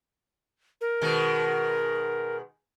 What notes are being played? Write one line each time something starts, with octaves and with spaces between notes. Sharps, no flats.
A#4
B2 D#3 G#3